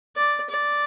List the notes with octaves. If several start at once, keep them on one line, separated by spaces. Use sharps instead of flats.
D5
D5